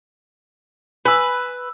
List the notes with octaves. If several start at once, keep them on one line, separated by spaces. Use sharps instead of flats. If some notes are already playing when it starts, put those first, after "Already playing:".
B4 G#5 E6